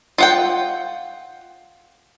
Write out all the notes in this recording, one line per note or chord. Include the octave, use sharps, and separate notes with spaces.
F4 F#5 G5